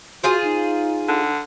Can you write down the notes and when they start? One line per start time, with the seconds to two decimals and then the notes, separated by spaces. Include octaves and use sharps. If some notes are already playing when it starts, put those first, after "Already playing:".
0.23 F4 F#4 G#4 C5
0.44 D#4
1.08 D3